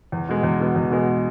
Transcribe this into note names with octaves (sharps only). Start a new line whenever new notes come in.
E2
B2 G#3
E2
B2 G#3
E2
B2 G#3